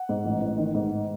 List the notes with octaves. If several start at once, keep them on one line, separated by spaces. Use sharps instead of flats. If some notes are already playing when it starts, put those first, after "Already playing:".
Already playing: F#5
G#2
A1
A1
D#3
G#2